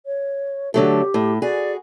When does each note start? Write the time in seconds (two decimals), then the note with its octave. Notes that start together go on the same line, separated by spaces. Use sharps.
0.06 C#5
0.74 D3 F#3 A3 G4
1.14 A2
1.42 F#4 G#4 D5